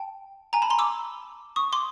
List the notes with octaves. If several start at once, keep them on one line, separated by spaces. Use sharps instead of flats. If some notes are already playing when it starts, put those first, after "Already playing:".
Already playing: G5 A5
G#5 A#5
A5 B5
A#5 C6
D6 E6
C#6 D#6
C6 D6